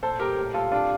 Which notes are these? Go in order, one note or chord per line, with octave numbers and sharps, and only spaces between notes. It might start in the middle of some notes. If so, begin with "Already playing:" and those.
A#2 A4 C5
G3 G4 A#4
A2
G3 F4 A4
C3 D4 F4